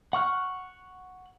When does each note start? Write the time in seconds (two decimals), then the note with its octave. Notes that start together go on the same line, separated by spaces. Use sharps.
0.13 F#5 C#6 F6 F#6